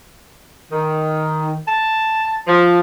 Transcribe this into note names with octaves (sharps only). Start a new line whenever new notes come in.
D#3
A5
F3